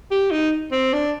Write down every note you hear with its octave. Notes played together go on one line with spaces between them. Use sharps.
G4
D#4
C4
D4